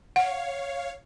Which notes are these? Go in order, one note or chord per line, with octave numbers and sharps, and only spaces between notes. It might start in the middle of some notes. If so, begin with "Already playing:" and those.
C#5 F5 F#5